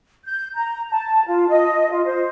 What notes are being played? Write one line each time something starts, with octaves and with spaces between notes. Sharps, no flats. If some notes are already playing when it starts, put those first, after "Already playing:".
G6
A#5
A5
F4
D#5
F4
C5